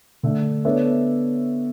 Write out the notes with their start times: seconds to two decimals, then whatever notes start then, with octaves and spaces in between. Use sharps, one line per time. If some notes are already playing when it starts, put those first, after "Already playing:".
0.23 D3 A3 D4
0.65 B3 D4 A4 C#5 E5